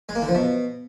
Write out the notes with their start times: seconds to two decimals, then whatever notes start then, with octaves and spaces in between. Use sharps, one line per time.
0.09 G#3
0.15 A#3
0.22 D3
0.28 F3
0.35 B2